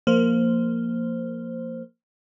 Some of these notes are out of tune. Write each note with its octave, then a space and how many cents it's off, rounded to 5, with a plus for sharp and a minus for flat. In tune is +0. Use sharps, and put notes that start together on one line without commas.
F3 +0 A#3 -10 C5 +0